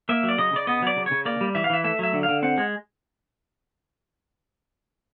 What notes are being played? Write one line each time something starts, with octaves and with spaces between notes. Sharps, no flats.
A#3 E5
F#3
D5
C#3 D#5
C#3 D5
B3 D#5
F#3 D5
C#3
C#5
C#3
A#3 D5
G3
E3 E5
F5
E3 E5
A3 E5
F#3 E5
D3
F5
D3
C4 F#5
G#3